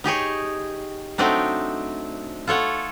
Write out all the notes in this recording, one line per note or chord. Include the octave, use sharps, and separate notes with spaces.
D#4 G4 G#4 C#5
F#3 A3 C4 D4 D#4
F4 A4 C#5 F#5